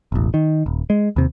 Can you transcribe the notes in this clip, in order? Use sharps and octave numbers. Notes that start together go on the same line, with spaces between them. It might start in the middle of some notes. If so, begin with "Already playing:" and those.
E1 A1
D#3
D#1
G#3
D#2 C3